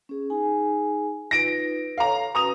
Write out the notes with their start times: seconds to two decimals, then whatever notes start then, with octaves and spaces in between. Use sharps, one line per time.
0.09 C#4 G#4
0.30 D#4 G#4 G#5
1.31 D#4 F4 B4 A#6 D7
1.98 A4 C#5 F5 A#5
2.35 C#4 F#4 B4 A#5 D#6 F7